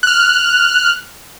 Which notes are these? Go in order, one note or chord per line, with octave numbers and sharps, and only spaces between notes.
F6 F#6